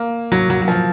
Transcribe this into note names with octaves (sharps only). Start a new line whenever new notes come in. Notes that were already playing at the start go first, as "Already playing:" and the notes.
Already playing: A#3
F#3
F#3
F#3
F3